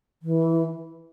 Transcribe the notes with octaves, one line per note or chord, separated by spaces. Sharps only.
E3